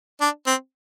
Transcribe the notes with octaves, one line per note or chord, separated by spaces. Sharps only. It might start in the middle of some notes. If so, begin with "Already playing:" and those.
D4
C4